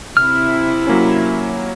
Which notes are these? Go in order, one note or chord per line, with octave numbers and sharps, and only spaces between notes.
C3 E4 F6
F#3 A#3 C#4